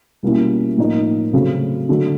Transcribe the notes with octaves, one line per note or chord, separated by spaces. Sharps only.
B2 G3 A#3 C#4 E4
A2 F3 A#3 D#4
C#3 F#3 A3 C4
D3 F#3 A3